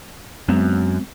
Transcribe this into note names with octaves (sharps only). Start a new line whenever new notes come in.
F#2 G#3 B3 C4